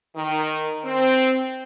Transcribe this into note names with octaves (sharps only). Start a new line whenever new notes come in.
D#3
C4